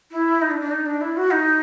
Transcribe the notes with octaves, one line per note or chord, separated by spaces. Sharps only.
E4
D#4
D4
D4
D#4
D4
E4
F#4
D#4